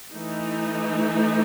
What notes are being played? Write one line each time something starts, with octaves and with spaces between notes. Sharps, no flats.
E3 A3 D#4